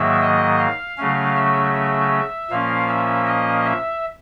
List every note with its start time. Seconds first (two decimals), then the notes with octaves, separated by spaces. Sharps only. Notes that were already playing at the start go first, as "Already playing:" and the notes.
Already playing: G#2 D#3 F#3 A#3 E5
0.21 D#5
0.59 F5
0.98 C#3 F#3 A3 C#4
1.36 E5
1.75 E5
2.50 A#2 F3 A#3 C#4 F5
2.89 E5
3.27 D#5
3.66 E5